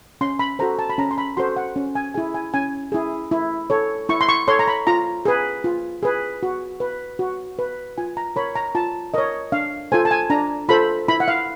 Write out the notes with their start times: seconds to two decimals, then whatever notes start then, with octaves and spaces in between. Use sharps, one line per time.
0.21 C#4 C6
0.39 B5
0.59 F#4 A4 C5 A#5
0.79 A5
0.90 B5
0.98 C#4 A#5
1.11 C6
1.18 B5
1.37 F#4 A4 C5 C6
1.56 F#5
1.76 C#4
1.95 G#5
2.14 E4 G#4 G#5
2.34 G#5
2.54 C#4 G#5
2.92 E4 G#4
3.31 E4
3.70 A4 C#5
4.09 E4 C#6
4.21 C6
4.29 C#6
4.48 A4 C#5 C6
4.59 A#5
4.68 B5
4.87 F4 A#5
5.25 G#4 B4
5.64 F4
6.03 G#4 B4
6.43 F#4
6.80 B4
7.19 F#4
7.59 B4
7.98 F4 G#5
8.17 A#5
8.36 A#4 C#5 B5
8.56 A#5
8.75 F4 A5
9.14 A#4 C#5 D#5
9.52 D4 F5
9.92 F4 A4 C5 G#5
10.05 A5
10.11 G#5
10.30 D4 A#5
10.69 F4 A4 C5 B5
11.08 E4 B5
11.20 F#5
11.28 F5